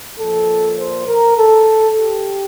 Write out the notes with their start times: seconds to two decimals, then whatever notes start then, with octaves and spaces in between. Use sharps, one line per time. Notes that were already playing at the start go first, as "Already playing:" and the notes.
0.19 A#2 F3 A4
0.79 C5
1.08 A#4
1.38 A4
1.98 G4